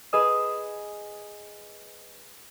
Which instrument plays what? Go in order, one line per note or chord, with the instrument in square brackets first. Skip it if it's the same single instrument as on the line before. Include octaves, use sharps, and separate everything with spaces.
[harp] G#4 B4 D#5 D#6 E6